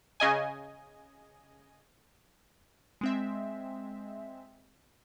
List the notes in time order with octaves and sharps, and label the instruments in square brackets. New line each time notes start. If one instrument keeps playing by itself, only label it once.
[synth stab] C#3 D#5 G#5
[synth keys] G#3 C4 E5